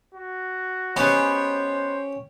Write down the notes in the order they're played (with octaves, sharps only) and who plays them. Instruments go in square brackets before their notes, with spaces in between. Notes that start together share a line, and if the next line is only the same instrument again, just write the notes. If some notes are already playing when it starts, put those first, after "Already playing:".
[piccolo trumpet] F#4
[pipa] F#3 G#3 B3 [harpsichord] C#4 G4 [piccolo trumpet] C5